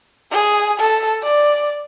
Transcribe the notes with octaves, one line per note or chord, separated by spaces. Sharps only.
G#4
A4
D5